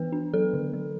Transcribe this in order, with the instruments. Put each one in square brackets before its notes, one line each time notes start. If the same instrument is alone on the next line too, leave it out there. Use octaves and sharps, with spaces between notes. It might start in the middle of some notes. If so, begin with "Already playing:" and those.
Already playing: [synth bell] E3 B3 B4
D4
F#3 A4
D3
F#3